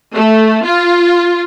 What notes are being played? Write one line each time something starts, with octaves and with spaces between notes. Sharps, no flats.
A3
F4